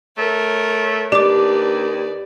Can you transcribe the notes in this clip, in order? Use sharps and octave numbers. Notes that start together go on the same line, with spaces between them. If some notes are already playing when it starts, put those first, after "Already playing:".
A3 A#4 C#5
D#2 D4 G4 B4 D5 D6